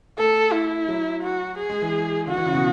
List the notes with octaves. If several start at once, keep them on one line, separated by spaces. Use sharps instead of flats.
A3 A4
E4
F#3
F#4
G#4
G#3
E3
D3 F#4
E3
C#3
B2